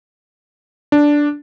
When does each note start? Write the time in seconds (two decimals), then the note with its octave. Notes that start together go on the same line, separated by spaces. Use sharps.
0.92 D4